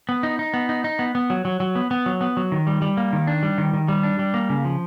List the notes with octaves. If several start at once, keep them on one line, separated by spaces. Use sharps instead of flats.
B3
D#4
D#4
B3
D#4
D#4
B3
B3
F#3
F#3
F#3
B3
B3
F#3
B3
F#3
D#3
G3
G3
A#3
D#3
D4
G3
D#3
D#3
G3
D4
G3
A#3
C#3
F3